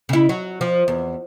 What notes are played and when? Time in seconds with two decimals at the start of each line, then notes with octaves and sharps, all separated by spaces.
0.09 C#3 E4
0.29 F#3
0.61 F3
0.88 E2